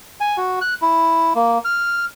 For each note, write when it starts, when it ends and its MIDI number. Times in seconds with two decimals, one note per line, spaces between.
0.20 0.37 80
0.37 0.59 66
0.61 0.74 90
0.82 1.33 64
1.35 1.58 58
1.65 2.05 89